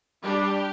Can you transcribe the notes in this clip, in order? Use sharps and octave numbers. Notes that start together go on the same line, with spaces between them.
G3 D4 G4